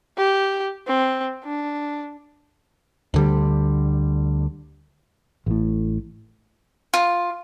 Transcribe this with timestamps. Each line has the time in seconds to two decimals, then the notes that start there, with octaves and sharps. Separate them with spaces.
0.17 G4
0.87 C4
1.44 D4
3.14 D2 D3 G3
5.46 A1 A2
6.94 F4